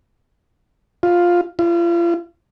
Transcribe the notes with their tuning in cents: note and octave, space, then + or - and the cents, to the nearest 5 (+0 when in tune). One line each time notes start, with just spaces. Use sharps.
F4 +5
F4 -40